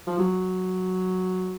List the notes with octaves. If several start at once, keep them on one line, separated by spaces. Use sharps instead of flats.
F3
F#3